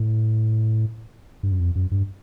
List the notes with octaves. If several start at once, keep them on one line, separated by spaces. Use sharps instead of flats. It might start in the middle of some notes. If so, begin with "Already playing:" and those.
Already playing: A2
G2
F#2
F2
F#2
G2